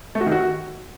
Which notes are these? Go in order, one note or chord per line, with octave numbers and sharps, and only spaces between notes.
A3
F#4
D#3
F#4